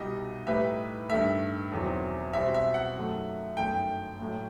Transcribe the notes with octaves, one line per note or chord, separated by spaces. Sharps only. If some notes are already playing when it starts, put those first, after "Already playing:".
Already playing: C2 B2 G3 D#4 G4 D#5
A2 G3 D#4 G4 B4 E5
G2 D#3 A3 E5
E1 E2 D#3 F#3 C4
B2 G3 C4 F#4 C5 E5
E5
F#5
F#2 D#3 F#3 A3
G1 F#2 D#3 A3 G5
A1 A2 F#3 A3